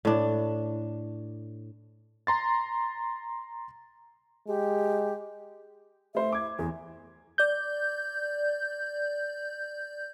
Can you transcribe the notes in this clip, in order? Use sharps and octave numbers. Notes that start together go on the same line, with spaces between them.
A2 D4
A#5 C6 A6
G#3 G4
A3 C5 E5
D6 G#6
E2 G#4
D5 G6